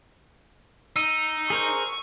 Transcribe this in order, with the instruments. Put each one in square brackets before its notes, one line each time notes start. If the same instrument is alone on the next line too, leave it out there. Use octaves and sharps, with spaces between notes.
[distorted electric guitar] D#4 [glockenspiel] E6 D#7
[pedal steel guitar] G#4 A#4 C5 [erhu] C#6